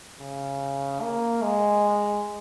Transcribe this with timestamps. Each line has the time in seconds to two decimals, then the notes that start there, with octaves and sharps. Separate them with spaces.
0.20 C#3
1.02 A#3
1.43 G#3